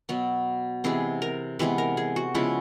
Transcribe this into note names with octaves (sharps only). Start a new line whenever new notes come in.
B2 F#3 B3
C3 E3 G#3 B3 G#4
A#4
C3 E3 G#3 B3 B4
A#4
G#4
F#4
C#3 F3 G#3 B3 E4